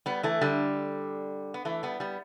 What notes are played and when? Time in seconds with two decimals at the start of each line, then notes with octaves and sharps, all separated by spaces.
0.06 G3 B3
0.23 E3 A3
0.41 D3 G3
1.54 B3
1.65 E3 A3
1.83 G3 B3
2.00 G3 B3